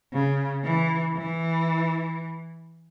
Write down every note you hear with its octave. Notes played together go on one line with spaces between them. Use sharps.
C#3
E3
E3